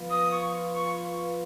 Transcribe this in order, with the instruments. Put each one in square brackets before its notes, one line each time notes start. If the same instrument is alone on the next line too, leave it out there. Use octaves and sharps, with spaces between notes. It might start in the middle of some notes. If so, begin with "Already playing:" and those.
Already playing: [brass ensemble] F3 B3 F4 B4
[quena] D#6
C#6
C#6